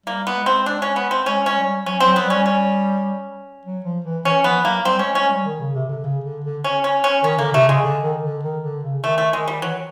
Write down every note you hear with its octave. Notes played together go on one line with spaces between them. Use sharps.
G3 A#3
B3
G#3
C4
D4
C#4
B3
C4
G#3 C#4
C#4
G3
F#3 C#4
F#3 C4
B3
G3 C#4
C#4
F#3
F3
E3
E3 C#4
F3 B3
F#3 A#3
G3 C4
G#3 C#4
G#3 C#4
G3
D#3
C#3
C3
D3
C#3
D3
D3
C#4
C#4
C#4
D#3 C#4
D3 A#3
C3 A3
C#3 G#3
D3
D#3
D3
D#3
D3
C#3
D#3 A3
A3
D#3 G#3
G3
E3 F#3